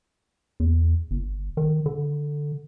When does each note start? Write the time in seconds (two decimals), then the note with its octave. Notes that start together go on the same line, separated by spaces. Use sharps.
0.60 E2
1.11 G1
1.57 D#3
1.86 D3